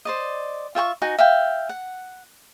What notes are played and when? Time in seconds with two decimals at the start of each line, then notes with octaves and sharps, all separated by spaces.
0.05 C5 D5 D#5
0.75 F4 E5 G5 C#6
1.02 D#4 F#4 G#5
1.18 E5 F5 G5
1.69 F#5